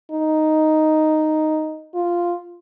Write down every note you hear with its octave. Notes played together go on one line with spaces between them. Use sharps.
D#4
F4